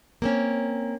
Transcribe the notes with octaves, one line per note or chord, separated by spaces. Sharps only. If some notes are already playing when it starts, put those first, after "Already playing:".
A#3 C4 C#4